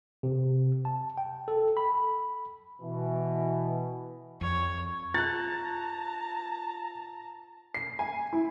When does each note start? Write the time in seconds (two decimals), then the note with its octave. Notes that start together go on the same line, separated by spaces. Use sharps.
0.23 C3
0.85 A5
1.18 G5
1.48 A4
1.77 B5
2.81 B2 E3
4.41 F2 C#5
5.14 F4 A5 A#5 F#6 A6
7.74 C7
7.99 G#5
8.33 E4